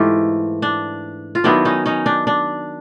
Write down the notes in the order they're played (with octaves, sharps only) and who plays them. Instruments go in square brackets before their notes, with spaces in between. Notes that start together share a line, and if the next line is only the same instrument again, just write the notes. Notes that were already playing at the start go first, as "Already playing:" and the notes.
Already playing: [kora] G#2 E3 A3 F4 G4
D4
F4
D#3 F#3 B3 D4 E4
C#4 D#4
C#4 D#4
D4
D4